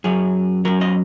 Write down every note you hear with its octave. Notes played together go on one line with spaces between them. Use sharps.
F#2 F#3 G#4
F#2 F#3 A#4
D#5